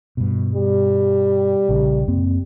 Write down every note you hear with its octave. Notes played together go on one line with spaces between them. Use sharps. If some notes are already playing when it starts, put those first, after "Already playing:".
G2 B2
G3
A#1 C#3
F#2 A#3 C4